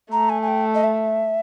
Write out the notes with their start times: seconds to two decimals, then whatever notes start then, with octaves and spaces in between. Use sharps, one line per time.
0.11 A3 A#5
0.29 G#5
0.42 G#5
0.48 G5
0.74 D#5
0.83 E5